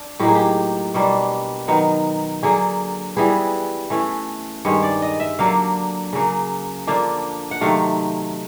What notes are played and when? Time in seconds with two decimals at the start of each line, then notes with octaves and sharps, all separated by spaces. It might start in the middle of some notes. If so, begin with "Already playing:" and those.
Already playing: D4
0.20 A2 F#3 A#3 D#4 G4
0.28 G#4
0.35 G4
0.94 B2 G3 A#3 D4
1.68 D#3 F#3 B3 D#4
2.43 D3 F#3 A#3 G#4
3.17 E3 G3 B3 G#4
3.90 E3 A3 C#4
4.65 G2 D#3 G#3 C#5
4.83 D5
5.02 D#5
5.20 E5
5.39 D3 F#3 A#3 D4 F5
6.13 C#3 F#3 A#3
6.87 D3 F3 A#3 D4
7.51 F#5
7.61 C3 D#3 F#3 A3 F5